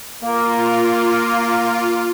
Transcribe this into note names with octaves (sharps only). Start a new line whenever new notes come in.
A#3 F4